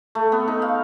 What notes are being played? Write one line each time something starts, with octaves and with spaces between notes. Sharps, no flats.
A3
B3
D#4
F5